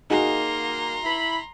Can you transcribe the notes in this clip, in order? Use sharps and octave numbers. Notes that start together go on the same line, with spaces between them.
A#3 D#4 F#4 G#4 A#5 C6
E4 B5